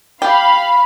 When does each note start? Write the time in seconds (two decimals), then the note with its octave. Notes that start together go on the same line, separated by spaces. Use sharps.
0.22 G4 F5 B5